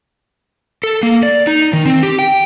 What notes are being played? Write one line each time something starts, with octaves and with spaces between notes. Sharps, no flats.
A4
A#3
D5
D#4
D#3
C4
G4
G5